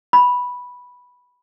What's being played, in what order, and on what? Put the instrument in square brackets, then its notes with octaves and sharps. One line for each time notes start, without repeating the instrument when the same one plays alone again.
[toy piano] B5